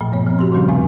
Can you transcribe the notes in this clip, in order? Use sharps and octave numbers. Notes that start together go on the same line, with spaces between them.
A#2 F3 A3
G2 B3 C#5
F3 C4
F#4 G4 C#5 C6
C#3 F3 G3 C#4 D4
E2 C3 A3 C4 G#5